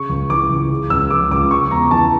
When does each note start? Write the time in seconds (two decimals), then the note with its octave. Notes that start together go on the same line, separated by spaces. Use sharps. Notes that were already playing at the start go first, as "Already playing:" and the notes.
Already playing: C#3 C#6
0.09 C#2
0.30 E3 D6
0.50 C#2
0.70 C#3
0.90 C#2 E6
1.10 F3 D6
1.31 C#2 D6
1.51 C#3 C#6
1.71 E2 A#5
1.91 E3 A5